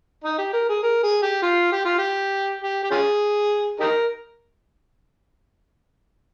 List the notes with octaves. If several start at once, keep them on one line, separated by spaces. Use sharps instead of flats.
D#4
G4
A#4
G#4
A#4
G#4
G4
F4
G4
F4
G4
G4
G4
C#4 F4 G#4
D#4 G4 A#4